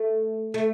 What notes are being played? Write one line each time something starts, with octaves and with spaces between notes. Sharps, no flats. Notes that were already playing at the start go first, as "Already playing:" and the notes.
Already playing: A3
A3